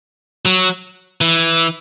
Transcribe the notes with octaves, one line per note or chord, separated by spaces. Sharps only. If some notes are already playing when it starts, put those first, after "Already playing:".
F#3
E3